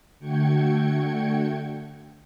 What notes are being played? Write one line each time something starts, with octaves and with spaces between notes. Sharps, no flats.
D3 A3 F#4 G5 G#6 C#7